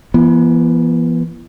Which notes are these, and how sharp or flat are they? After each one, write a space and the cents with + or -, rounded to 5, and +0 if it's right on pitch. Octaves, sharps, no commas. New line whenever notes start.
E3 +40 B3 -35